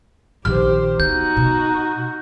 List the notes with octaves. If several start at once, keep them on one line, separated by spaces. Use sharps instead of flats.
A#1 D#3 G4 C5 F6
B3 D#4 F#4 G6
B2